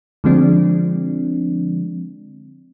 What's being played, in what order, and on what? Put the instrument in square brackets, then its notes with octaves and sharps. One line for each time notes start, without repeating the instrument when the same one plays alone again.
[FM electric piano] D3 F3 G#3 C4 D4